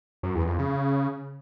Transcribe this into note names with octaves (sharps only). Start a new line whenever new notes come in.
F#2
E2
F2
C#3